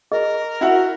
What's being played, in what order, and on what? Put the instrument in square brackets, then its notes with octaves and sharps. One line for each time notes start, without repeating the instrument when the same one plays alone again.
[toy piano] G#4 D#5 [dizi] A#4
[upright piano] E4 F#5 [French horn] F#4